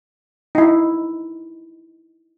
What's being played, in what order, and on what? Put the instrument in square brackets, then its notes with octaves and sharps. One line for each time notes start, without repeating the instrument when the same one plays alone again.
[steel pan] D#4 E4